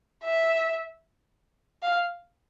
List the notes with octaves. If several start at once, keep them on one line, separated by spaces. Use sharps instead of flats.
E5
F5